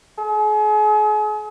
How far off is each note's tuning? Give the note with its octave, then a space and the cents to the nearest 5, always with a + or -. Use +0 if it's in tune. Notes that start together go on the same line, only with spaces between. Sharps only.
G#4 +40